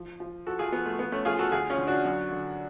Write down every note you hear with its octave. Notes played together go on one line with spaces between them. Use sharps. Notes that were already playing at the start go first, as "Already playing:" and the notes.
Already playing: F3
F3
F3 F#4 A4
F4 G#4
F3 B3
A3
F3 B3
A3 C#4
F3 F4 G#4
F#4 A4
D2 F4 G#4
C#4 F4
D3
D4 F#4
F#2
D3